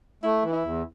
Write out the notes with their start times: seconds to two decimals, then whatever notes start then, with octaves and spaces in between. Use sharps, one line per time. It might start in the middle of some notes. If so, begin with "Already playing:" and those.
0.23 A3 E4
0.43 E3
0.53 E4
0.63 E2